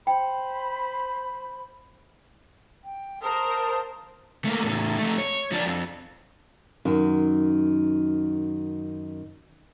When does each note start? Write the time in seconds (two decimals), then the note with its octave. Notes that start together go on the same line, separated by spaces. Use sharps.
0.07 C5 G5 B5
2.83 G5
3.22 A#4 C5 F5 A5 D#6
4.45 A3 A#3
4.63 E2 A2
4.98 F3 A3
5.18 C#5
5.52 F3 D4
5.66 F2
6.85 F#2 D#3